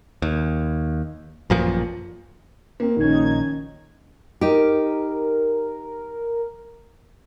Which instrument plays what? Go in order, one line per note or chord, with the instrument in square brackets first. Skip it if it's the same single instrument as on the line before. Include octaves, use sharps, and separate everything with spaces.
[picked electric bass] D#2
A1 F#2 A#2 F3
[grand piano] A#3 C4
[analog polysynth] A#1 D#4 G#6 [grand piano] D#3 C#4
[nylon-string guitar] D#4 G4 [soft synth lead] A#4